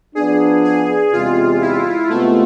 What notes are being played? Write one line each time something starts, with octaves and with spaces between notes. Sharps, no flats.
F3 B3 D4 G#4
G#4
E2 C3 G#3 F4
E4
C3 G#3 A3 B3 F4